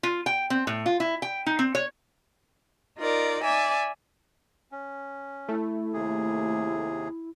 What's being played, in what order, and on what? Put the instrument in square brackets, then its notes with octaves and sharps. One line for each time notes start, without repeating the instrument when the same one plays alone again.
[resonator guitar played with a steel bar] F4
G5
C4
A2
F4
E4
G5
D#4
C4
C#5
[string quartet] D#4 F4 A#4 D5
D5 E5 G#5
[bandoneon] C#4
[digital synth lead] A3 [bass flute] E4
[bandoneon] D#2 C3 G#4